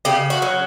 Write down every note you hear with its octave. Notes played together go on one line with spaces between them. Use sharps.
C#3 G4
F#4
F#3